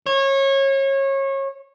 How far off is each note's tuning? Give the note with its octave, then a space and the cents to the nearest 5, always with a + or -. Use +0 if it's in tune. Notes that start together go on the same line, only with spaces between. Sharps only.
C#5 -25